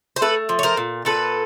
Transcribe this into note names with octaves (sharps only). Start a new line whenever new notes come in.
C5
A3 A4 B4
F3
C#5
A#4 C5
A#2
A#2 A4 B4